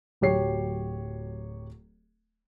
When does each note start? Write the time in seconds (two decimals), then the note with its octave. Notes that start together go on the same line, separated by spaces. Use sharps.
0.21 D1 F#3 G4 C#5 C7